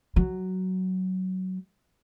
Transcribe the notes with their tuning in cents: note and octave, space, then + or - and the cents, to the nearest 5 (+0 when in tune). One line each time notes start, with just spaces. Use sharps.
F#3 +10